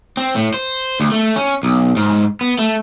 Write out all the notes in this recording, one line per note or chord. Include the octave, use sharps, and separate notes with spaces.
C4
A2
C5
D2
A3
C#4
B1
G#2
B3
A3